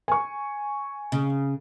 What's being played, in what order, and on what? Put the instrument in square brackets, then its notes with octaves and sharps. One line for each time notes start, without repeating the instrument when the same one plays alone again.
[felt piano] G#5 C#6
[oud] C#3